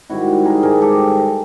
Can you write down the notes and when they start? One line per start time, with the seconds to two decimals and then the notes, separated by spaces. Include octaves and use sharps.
0.10 G#2 D#3 G3 E4 F#4
0.45 G#4 A#4
0.63 G#2 D#3 G3 G#4 A#4
0.81 G4 A4